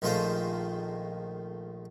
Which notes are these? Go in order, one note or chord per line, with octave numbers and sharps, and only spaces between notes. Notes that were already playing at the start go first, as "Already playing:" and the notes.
A#1 D#3 G#3 A3 F4 C5